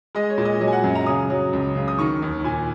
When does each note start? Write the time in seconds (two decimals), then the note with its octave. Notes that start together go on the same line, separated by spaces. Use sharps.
0.15 G#3 D#5
0.30 C#5
0.38 A#2
0.45 D#5
0.61 F#3 D#5
0.68 G#5
0.73 F#5
0.84 F#2
0.95 A#5
1.06 C#3 D#6
1.30 F#3
1.53 C#2
1.75 C#3
1.88 D#6
1.99 D#3 C#6
2.22 D#2
2.44 A#2 G#5